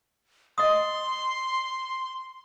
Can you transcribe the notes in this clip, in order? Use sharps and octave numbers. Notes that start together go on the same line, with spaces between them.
D#5 C6 D#6